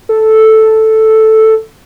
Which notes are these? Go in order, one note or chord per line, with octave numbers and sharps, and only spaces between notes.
A4